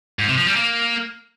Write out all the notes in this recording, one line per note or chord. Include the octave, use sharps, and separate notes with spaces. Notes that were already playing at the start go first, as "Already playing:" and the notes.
G#2
C3
F3
G3
A#3